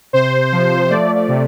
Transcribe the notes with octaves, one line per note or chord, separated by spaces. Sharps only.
C3 C5
F3
A3 D5
D5
C3